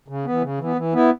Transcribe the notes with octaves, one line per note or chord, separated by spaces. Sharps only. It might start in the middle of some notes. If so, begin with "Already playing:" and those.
C#3
E3 B3
C#3
E3 B3
E3
B3 E4